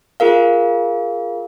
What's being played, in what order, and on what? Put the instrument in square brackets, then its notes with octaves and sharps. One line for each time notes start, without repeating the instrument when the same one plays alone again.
[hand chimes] F4 G#4 A#4 F5